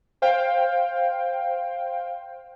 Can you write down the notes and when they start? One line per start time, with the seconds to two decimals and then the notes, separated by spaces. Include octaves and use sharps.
0.22 C5 F5 G5